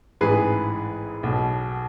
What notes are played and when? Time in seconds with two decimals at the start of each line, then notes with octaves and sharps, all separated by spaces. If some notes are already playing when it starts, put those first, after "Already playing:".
0.21 A1 G#2 E3 G#4 B4
1.23 B1 B2